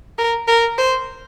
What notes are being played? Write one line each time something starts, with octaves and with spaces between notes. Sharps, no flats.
A#4
A#4
C5